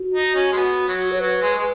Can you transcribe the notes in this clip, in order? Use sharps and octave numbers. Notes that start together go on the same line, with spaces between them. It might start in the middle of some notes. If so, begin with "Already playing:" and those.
Already playing: F#4
D#4
C#4
G#3
B3
F#3
C#5
F#3 B4
G#3
G#3